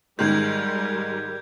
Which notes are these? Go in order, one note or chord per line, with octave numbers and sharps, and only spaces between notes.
G#2 D#3 G3 G#3 G4 A#4 G6 G#6